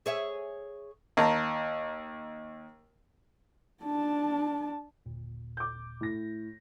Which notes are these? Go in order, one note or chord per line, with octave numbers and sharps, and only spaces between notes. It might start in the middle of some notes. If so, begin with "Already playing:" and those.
G#4 C#5 E5
D#2 A5 A#5
D4 A5
G1 D#2 A#2
D6 G6
A2 A#6